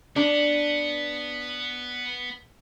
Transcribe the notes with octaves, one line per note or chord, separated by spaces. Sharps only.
B3 D4